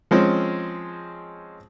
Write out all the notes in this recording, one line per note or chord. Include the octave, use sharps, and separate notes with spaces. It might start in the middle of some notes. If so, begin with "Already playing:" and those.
F3 G#3 C4 C#4